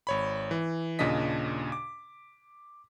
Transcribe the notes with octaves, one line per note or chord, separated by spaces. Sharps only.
G#1 C#5 B5
E3
D#2 A#2 C#3 D4 D#5 B6
D6